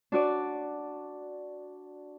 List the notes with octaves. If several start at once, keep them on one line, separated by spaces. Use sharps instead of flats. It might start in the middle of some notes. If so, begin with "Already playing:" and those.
D4 F#4 D5